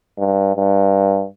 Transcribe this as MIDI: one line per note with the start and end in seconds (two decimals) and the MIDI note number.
0.18 0.52 43
0.56 1.25 43